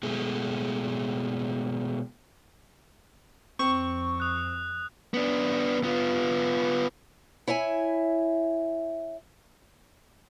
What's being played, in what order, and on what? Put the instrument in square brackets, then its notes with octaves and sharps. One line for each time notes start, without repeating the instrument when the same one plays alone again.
[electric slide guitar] B2 G#3 A3
[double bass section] F2 [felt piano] C4 [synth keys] C#6
[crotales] D#6 F#6
[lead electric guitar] B3 D4
B3 F4
[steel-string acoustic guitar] E4 C#5 E5 G#5